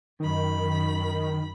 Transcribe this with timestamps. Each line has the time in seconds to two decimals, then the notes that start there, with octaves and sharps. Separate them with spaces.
0.20 F#2 D#3 B5